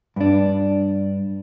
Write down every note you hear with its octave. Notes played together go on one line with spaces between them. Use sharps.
G2 D4